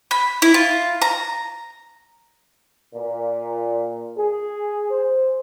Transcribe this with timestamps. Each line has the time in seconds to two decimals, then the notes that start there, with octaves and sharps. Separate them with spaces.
0.11 B5
0.42 E4
0.54 F4
1.02 A#5
2.95 A#2
4.17 G#4
4.91 C5